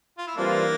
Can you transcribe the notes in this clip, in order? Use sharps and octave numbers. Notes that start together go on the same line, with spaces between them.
F4
E4
E3 G3 A#3 C4 D4 F4